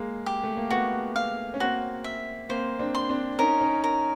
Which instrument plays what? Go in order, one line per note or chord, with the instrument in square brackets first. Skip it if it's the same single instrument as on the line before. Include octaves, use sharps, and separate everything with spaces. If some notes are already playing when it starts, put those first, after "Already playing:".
Already playing: [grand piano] G#3 A#3
[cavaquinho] G4
[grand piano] A3
A#3
[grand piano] A3 B3 [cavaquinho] F#4
[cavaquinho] F5
[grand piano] C#4
[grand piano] A#3 C4 [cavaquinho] F#4
[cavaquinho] E5
[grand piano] A#3 C4 [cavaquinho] C5
[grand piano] C4 D4
[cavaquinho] C6
[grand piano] C4 D4
[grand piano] C#4 D#4 [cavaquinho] A#4
[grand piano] C#4 D#4
[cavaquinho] A#4